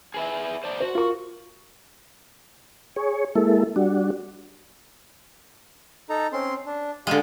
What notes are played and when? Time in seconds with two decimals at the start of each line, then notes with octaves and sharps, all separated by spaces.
0.14 G#4 B4 E5
0.64 C5 D5 A5
0.80 F#4 C5
0.95 F4 A#4 C#6
2.96 G#4 C#5
3.35 G#3 A#3 E4 A4
3.76 G3 D4 F#4
6.10 D#4 A4 A#5
6.33 C4 C#4 C6
6.66 D4
7.07 D3 G#3 G4 F5 G#5